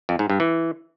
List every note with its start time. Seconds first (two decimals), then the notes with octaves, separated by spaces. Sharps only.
0.09 F2
0.19 G#2
0.30 G2
0.40 E3